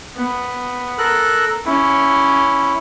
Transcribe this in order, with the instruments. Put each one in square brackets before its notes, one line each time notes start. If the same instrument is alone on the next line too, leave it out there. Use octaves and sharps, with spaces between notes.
[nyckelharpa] B3
[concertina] A4 A#4 F#6
[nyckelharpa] C#4 [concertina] E4